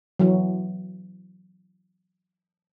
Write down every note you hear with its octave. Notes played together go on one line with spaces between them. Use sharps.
E3 F#3